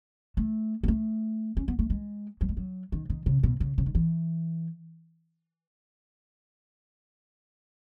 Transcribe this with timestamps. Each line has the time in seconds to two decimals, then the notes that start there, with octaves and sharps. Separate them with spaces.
0.37 A3
0.83 B3
0.88 A3
1.57 C#4
1.68 B3
1.79 A3
1.90 G#3
2.41 F#3
2.49 G#3
2.57 F#3
2.92 D#3
3.10 D#3
3.26 C#3
3.43 B2
3.60 C#3
3.78 C#3
3.86 D#3
3.95 E3